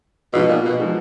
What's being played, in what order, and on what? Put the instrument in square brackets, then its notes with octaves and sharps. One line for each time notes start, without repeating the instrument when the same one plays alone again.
[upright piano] G#2 F3 B3 D#4 F#4 [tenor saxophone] B2
[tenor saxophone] A#2
B2
[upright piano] F3 G#3 D#4 F#4